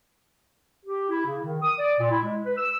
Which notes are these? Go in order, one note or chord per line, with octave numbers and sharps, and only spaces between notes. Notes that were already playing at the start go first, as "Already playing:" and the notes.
G4
E4
C#3
D#3
D#6
D5
A#2
E4
G#3
B4
E6